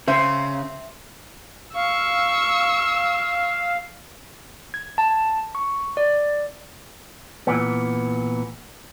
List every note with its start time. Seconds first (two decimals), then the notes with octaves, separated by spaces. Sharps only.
0.08 C#3 C4 C5 E5
1.76 F5 C#6 E6
4.74 G#6
4.98 A5
5.55 C#6
5.97 D5
7.47 A#2 E3 B3